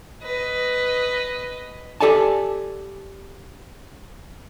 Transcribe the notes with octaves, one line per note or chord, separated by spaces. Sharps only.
B4 D#5
G4 A4 D5 G#5 A5